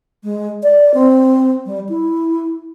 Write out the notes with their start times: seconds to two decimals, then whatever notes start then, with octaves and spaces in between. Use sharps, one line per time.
0.23 G#3
0.63 D5
0.94 C4
1.66 G3
1.89 E4